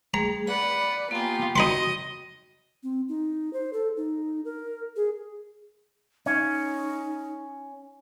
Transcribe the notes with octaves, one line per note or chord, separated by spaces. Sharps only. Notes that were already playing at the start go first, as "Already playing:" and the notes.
G3 A3 G#4 A#5
B4 D5 F#5 B5
A#3 B3 F4 G4 G#5
D#4 F#4 D#5 B5 C6
C4
D#4
C5
A4
D#4
A#4
G#4
C#4 D#4